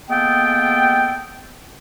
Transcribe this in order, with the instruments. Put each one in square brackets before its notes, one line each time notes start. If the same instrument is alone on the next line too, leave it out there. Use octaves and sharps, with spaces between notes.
[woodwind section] G#3 A#3 B3 A4 G5